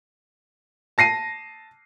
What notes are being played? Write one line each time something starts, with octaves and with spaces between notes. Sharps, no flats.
A5 A#6 C7 D#7